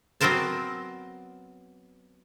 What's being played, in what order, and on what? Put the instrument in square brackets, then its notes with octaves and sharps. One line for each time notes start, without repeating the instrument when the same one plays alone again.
[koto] F#3 B3 C4 A#4 C5 A5